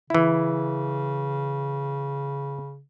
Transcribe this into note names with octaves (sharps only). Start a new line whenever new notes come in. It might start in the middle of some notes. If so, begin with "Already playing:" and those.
C#3 E3 E4